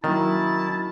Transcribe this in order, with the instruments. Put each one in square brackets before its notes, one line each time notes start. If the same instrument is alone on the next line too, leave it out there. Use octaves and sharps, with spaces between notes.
[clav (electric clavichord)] D#3 [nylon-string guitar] F#3 A#3 C#4 [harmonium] E4 [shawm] A5